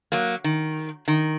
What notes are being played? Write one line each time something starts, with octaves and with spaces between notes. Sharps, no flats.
F#3 A#3
D#3
D#3